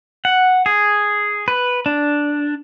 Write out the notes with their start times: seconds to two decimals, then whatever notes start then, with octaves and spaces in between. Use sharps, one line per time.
0.25 F#5
0.66 G#4
1.48 B4
1.86 D4